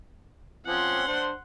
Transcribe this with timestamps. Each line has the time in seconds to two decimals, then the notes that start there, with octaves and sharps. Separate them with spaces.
0.66 F3 C4 C#4 F#5 C6
1.08 D4 C5